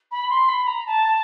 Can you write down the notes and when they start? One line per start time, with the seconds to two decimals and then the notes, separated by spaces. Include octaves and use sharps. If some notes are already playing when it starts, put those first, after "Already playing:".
0.11 B5
0.30 C6
0.49 B5
0.67 A#5
0.86 A5